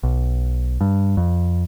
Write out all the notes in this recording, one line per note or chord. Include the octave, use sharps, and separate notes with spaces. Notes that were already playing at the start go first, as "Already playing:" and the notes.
B1
G2
F2